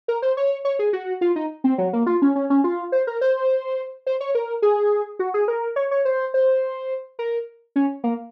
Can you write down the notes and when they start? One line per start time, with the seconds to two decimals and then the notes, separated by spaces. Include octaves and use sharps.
0.08 A#4
0.22 C5
0.37 C#5
0.65 C#5
0.79 G#4
0.93 F#4
1.21 F4
1.36 D#4
1.64 C4
1.78 F#3
1.93 A#3
2.07 F4
2.22 C#4
2.35 C#4
2.50 C#4
2.64 F4
2.92 C5
3.07 A#4
3.21 C5
4.07 C5
4.21 C#5
4.35 A#4
4.62 G#4
5.19 F#4
5.34 G#4
5.48 A#4
5.76 C#5
5.91 C#5
6.05 C5
6.34 C5
7.19 A#4
7.76 C#4
8.04 A#3